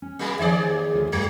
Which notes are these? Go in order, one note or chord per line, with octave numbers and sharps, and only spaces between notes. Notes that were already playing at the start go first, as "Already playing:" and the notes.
C#4
F#3 G#3 A#3
D#2 F3 G#4 C5 D5 E5
D2 F4
G2 G#3